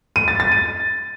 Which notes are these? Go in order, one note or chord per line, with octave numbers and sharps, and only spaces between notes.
D#7
A6
A6
D#7